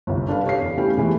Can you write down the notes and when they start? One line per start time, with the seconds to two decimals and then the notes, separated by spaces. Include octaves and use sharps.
0.07 G1 C2
0.28 D4 A4 B4 F5
0.45 G4 C#5 F5 C7
0.60 E2
0.78 G3 A3 C#4 E4 G4
0.97 B2 E3 G#3 A3